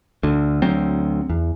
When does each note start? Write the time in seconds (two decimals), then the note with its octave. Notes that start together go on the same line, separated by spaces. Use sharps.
0.23 D2 D3
0.62 D2 F#3 C4
1.30 E2